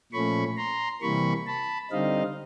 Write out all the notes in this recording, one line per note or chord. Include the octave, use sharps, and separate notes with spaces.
A#2 F3 A3 C#4 B5 C#6
A#5 C6
C3 E3 G3 A#3 B5 C#6
A5 B5
D3 G3 C4 D#4 D#5 F5